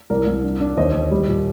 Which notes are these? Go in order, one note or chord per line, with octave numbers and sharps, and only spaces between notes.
C2 A#4 D5
C2
D4
D4
D#2 C5 D#5
D#2
G3
A#2